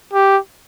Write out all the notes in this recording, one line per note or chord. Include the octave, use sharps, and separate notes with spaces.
G4